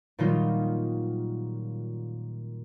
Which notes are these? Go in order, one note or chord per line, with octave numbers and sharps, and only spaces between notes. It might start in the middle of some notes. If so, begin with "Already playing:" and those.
A#2 D#3 F#3 G3 D#4 F4